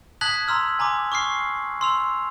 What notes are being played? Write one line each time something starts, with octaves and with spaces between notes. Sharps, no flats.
A5 D#6 F#6 G#6 B6 F#7
A#5 C6 E6 F6
G#5 A#5 C6 D6
C#6 D6 F6 C7
C6 E6 F7